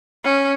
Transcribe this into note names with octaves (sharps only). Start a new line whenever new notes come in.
C#4